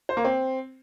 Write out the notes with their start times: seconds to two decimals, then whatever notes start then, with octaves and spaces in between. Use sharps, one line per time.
0.09 C5
0.17 A#3
0.25 C4